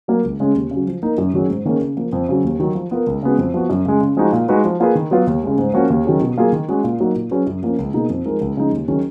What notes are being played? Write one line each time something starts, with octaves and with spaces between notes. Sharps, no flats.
F#3 A#3
C#2
C#3 G#3 C#4 G#4
D#2
C#3 F#3
F3
A#3 D#4 A#4
F#2
D#3 F#3 C#4 G#4
G#2
D#3 A#3 C#4 G#4
C#3
F3 A#3
F2
C#3 F#3
D#2
D#3 F#3
F3
B3 F4 A#4
C#2
C#3 G#3 B3 F#4
F2
F3 B3 F#4
F#2
C#3 G#3
C#3
F3 G#3 D#4 F#4
A#2
G#3 D#4 F#4 B4
F3
A#3 F4 G#4 B4
D#3
F#3 B3 F4 B4
D#2
C#3 G#3
G#2
F3 A#3 C#4 F#4
D#2
D#3 F#3 C#4 G#4
B2
F#3 A#3 F4 G#4
D#3
G#3 C#4 F#4
A#2
F#3 A#3 D#4 F#4
A#2
F#3 C#4 G#4 B4
F#2
F3 A#3 C#4 F4
C#2
B2 A#3 D#4 G#4
F2
F3 G#3 D#4 A#4
C#2
C#3 F3 G#3 D#4
D#2
D#3 F#3 C#4 G#4